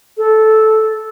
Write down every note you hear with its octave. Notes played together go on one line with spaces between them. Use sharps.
A4